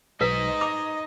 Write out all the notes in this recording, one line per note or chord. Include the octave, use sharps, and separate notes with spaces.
B1 D#4 B4 C5 D#5 B6
A#5 D6